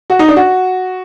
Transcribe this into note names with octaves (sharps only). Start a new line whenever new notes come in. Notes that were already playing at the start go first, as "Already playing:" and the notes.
F#4
D#4
D4
F#4